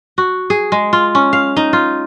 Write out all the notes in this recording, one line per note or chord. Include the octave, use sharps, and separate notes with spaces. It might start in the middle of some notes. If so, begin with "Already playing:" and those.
F#4
G#4
G#3
F4
C#4
F5
D#4
F4